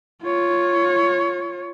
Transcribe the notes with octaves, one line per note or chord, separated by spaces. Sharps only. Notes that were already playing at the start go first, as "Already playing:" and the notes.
F4 C#5